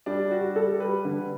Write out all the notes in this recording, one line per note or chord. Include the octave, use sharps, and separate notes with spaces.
G3 D4
G3 F#4
G3 A4
G3 B4
D3